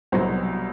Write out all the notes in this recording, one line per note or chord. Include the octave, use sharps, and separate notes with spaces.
C2 B2 F#3 C5